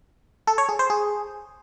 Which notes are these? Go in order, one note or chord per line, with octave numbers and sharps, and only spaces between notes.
A4
C#5
G#4
C5
G#4